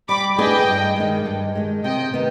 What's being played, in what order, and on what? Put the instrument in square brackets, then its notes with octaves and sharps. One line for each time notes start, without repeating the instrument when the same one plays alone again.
[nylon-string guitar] G3 [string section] B5 D6
[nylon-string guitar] B3 D4 G#4 [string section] D#5 G5
[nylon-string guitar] G2
D#3 G#3
G2
D#3 G#3
[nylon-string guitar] C3 [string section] D#5 G5
[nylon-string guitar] D#3 B3 D#4